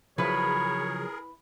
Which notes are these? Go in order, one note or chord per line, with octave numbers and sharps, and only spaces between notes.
C#3 F3 F#3 E4 G#4 A#4 B4 C#5